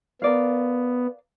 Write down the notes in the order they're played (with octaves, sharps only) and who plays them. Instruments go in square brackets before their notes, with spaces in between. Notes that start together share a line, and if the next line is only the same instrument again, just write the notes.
[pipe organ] B3 [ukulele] A#4 D5 F5